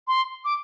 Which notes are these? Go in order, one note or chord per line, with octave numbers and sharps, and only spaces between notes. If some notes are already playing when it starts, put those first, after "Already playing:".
C6
D6